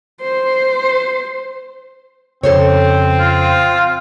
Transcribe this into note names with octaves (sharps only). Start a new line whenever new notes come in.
C5
F2 C#3 C4 A4 C5 C#5
F4